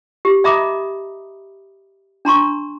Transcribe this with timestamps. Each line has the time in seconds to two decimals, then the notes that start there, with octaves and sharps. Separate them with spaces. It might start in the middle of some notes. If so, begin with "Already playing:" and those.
0.25 G4
0.44 D#5 E5 A#5 B5 D6 D#6
2.25 D4 A#5 C6 C#6